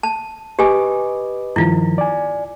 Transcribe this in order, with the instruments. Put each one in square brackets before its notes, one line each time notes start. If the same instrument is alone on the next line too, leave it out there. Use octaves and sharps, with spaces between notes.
[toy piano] A5
[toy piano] G4 G#5 [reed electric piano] B4 D#5 D6
[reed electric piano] G2 D#3 F3 [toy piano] E4 F4
[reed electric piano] D5 G#5